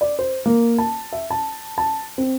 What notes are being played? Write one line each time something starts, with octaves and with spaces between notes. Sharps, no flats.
D5
C5
A#3
A5
E5
A5
A5
C4